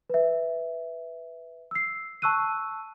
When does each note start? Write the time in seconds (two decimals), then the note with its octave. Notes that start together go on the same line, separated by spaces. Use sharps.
0.10 B4 E5
1.71 E6 C7
2.22 A5 C#6 E6 F#6 D#7